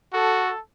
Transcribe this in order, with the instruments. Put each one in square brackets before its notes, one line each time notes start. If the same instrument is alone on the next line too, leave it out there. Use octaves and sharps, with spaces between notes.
[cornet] F#4 [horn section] A4